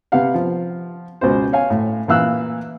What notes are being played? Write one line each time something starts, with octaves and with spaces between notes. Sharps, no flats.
C3 B3 G4 F5 F#5
F3
C#2 B2 C5
C#5 F5 G#5
A2
A#2 E3 F5 E6 F#6